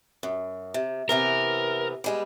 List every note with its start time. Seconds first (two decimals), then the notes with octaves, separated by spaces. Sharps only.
0.23 F#2
0.74 C3
1.09 C3 E3 B3 A#4
2.04 G3 G#3 B3